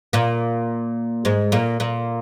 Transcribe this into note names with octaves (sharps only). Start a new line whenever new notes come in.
A#2 A#3
G#2 G#3
A#2 A#3
A#2 A#3